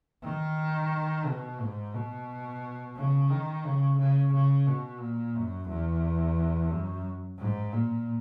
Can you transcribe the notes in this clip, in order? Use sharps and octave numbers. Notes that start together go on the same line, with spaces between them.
D#3
B2
G#2
B2
C#3
D#3
C#3
C#3
C#3
B2
A#2
F#2
E2
F#2
G#2
A#2